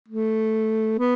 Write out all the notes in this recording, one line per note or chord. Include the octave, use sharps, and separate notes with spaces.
A3
B3